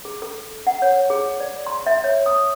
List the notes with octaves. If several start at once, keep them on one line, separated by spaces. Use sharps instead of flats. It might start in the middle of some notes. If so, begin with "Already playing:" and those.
G#4
A4
F#5
C#5
G#4
D5
C6
E5
C#5
D#6